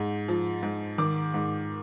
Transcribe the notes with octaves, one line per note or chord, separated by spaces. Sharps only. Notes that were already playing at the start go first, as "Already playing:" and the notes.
Already playing: G#2
F3
G#2
D#3 D6
G#2